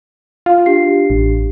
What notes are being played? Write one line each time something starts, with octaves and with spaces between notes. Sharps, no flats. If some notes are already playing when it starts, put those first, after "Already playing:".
F4 F5
D4 G4 C7
A1